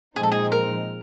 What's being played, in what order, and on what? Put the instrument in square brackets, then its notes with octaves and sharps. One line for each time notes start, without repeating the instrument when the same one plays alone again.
[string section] A#2 F3 G#3 C4 D#4 [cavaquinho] G#4
[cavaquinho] A4
G#4
A#4